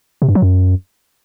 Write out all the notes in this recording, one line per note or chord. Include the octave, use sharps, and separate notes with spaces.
C3
G2
F#3
F#2